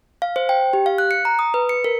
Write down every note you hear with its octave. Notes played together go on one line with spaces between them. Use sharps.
F5
C5
G5
G4
F5
F#6
C#7
A#5
D#6
B4
C#7
A#4